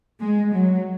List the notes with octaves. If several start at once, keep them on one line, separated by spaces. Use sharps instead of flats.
G#3
F#3